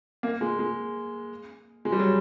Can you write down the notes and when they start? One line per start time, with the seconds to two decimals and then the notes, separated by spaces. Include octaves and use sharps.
0.23 A#3
0.41 G#3
0.59 G#3
1.85 G#3
1.92 G3
2.00 F#3